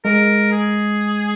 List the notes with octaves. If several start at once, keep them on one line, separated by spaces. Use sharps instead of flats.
G#3 A#4
G#4